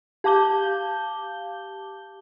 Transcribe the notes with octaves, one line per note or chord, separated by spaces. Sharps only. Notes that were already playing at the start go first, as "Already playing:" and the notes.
G4 F5 A5 D6 G6 G7